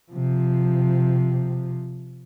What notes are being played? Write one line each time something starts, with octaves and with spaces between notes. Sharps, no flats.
C3 F3